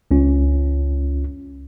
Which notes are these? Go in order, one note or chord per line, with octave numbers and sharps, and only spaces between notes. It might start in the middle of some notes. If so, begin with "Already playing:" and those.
C#2 C#4 F4